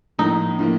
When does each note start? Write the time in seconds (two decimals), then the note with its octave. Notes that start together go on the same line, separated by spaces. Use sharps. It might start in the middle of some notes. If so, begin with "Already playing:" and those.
0.19 A2 F3 A#3 D#4
0.59 A2 F3 A#3